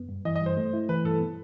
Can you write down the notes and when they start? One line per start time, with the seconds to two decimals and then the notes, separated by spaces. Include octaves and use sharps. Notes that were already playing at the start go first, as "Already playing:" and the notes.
Already playing: F#2 B3
0.09 G2
0.25 E3 D#5
0.36 D#5
0.41 G2 C5
0.57 A3
0.73 E4
0.89 E3 B4
1.05 G2 A4
1.20 B3